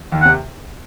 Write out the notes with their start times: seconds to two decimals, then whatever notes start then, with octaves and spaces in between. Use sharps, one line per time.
0.12 D#2 D#3
0.22 C3 F#5